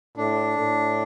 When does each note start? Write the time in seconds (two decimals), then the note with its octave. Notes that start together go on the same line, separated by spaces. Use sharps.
0.17 A2 D4
0.58 A2